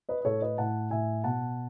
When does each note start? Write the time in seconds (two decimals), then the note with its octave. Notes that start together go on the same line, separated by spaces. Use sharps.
0.09 B4 D#5
0.21 D#5
0.25 A2 A4 C#5
0.42 B4 D#5
0.58 A2 F#5 A5
0.91 A2 E5 G#5
1.24 B2 F#5 A5